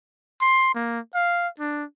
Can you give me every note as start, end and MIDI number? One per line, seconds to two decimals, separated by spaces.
0.41 0.71 84
0.75 0.99 58
1.14 1.48 77
1.59 1.84 62